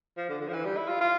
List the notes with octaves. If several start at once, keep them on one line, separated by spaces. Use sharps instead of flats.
F3
D3
D3
F3
E3
G3
E4
F4
F4